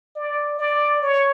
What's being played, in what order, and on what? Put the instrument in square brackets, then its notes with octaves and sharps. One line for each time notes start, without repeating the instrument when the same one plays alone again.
[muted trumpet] D5
D5
C#5